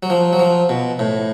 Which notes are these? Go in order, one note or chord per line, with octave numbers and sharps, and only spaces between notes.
F#3
F3
F#3
F3
B2
A2